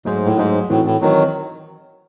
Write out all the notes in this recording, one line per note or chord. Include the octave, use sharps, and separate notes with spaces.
G#2 F#3 A3 D#4 G#4 C5
A2
G#2 F#3 A3 D#4 G#4 C5
A2 E3 C4 F#4
A2
D#3 E3 F#3 C4